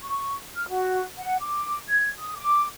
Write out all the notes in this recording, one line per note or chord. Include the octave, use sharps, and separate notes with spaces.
C#6
F6
F#4
F#5
D6
G#6
D#6
D6